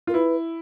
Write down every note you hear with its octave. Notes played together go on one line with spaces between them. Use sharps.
F4 A#4
E4 B4